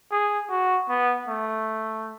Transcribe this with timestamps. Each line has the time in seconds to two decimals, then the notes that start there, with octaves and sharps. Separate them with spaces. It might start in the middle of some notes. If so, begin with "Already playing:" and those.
0.11 G#4
0.50 F#4
0.89 B3
1.28 A3